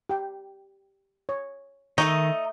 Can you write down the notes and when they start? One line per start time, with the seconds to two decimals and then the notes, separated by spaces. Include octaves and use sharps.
0.09 G4 G5
1.29 C#5
1.98 D#3 A3 A#3 D#4 D#5 C#6